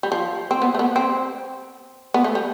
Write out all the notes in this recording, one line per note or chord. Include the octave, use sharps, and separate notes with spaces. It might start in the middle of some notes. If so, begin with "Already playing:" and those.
G3
F3
C4
B3
A3
B3
C4
B3
A3
G3